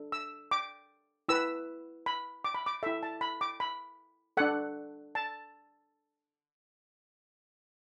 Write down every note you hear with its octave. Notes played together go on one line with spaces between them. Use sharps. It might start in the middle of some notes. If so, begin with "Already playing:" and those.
Already playing: D4 A4
E6
D6
E4 B4 E6
B5
D6
B5
D6
E4 A4 E5
A5
B5
D6
B5
D4 A4 F#5
A5